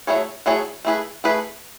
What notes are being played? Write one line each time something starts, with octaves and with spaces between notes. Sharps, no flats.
F#3 A3 E4 G#4 C#5
F#3 A3 E4 G#4 C#5
A3 E4 G#4 B4
A3 E4 G#4 B4